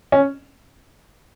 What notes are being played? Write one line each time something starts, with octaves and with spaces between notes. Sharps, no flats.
C#4